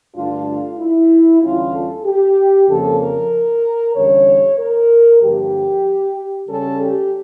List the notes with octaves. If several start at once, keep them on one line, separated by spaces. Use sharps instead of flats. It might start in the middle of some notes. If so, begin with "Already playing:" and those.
G2 D3 A3 D4 F4
F4
E4
E2 D3 G3 C#4 F4
A4
G4
F2 C#3 F3 A#3 C#4 A4
A#4
E2 D3 G3 C#4 C#5
A#4
G2 D3 F3 A#3 G4
C#3 G3 C#4 A4
G4